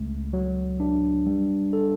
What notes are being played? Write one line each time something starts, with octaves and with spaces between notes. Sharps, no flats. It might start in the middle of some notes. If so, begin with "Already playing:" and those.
Already playing: C#2 A3
F#3
D4
G3
A4